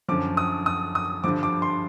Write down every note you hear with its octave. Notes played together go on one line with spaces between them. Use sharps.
F#2 D3 F3 D6
D#6
D#6
D#6
G2 D3 F3 D6
D6
C6